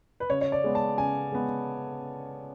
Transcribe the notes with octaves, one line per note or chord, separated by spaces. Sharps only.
B4
C#3 C#5
C#5
D5
G#3 B3
A5
C#3 G#5
G#3 B3